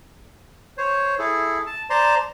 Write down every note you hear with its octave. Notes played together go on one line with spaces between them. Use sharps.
C5 C#5
E4 G#4 A4
A5
C5 D5 A5 A#5 C6